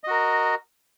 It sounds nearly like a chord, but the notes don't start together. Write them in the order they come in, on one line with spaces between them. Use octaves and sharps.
D#5 F#4 A#4